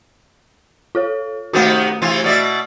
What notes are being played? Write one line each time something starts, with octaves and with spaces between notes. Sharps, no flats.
F4 A4 C#5
C3 D#3 A3 B3 F#4
C3 E3 F4
B2 D5 E5